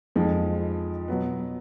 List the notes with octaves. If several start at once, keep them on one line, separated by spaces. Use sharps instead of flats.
F2 F3 G#3 D#4
B2 F#3 B3